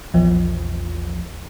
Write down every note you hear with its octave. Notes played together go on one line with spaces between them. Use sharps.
A#1 E2 F3